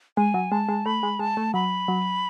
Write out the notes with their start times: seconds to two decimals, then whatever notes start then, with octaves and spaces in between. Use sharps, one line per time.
0.17 G#3 G#5
0.34 F#3
0.51 G#3 A5
0.69 G#3
0.86 A3 B5
1.03 G#3
1.19 G#3 A5
1.37 A3
1.54 F#3 B5
1.88 F#3